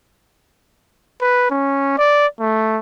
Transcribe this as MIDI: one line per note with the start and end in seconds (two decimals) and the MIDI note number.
1.21 1.45 71
1.50 1.94 61
1.98 2.26 74
2.40 2.79 57